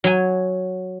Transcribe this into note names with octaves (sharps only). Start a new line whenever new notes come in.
F#3 G#5